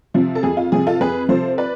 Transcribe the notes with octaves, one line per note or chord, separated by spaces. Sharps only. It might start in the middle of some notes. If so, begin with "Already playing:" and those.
C3 F3
A4
F2 G#4
F4
C3 F3 G#4
F4 A4
F2 G#4 B4
C3 F3 A4 C5
B4 D5